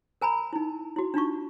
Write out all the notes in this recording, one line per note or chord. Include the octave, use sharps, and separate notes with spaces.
A#4 G#5 A#5 B5
D#4 E4
E4 F#4
D4 D#4 F4 C#6